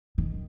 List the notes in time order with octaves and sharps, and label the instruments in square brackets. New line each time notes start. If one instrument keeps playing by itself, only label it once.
[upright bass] D#3